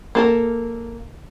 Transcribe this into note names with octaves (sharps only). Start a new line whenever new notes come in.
A#3 A4 A#4